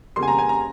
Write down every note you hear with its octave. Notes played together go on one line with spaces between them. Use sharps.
F2 C#3 G3 A#3 C6
G#5
A#5
G#5
A#5